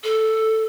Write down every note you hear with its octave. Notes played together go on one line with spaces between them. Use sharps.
A4